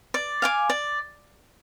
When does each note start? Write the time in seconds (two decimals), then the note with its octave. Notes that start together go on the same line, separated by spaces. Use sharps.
0.14 D5
0.42 F5 G#5 D6
0.70 D5